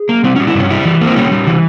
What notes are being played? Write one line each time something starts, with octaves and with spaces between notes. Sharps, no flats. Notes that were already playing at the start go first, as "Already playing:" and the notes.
Already playing: G#4
A#3
G3 C4
G3 C#4
E4
G2 C#4
G3 E4
E3
A#3
C4
G3 C#4
G3
E3